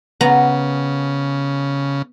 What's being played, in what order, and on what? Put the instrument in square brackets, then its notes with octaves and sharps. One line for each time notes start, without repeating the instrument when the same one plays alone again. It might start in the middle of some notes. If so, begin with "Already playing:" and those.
[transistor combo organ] C#3 [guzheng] B3 A#5